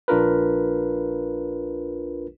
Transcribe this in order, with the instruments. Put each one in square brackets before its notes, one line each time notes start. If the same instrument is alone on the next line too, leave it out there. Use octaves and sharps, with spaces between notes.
[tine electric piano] A#1 D4 F4 A#4 B4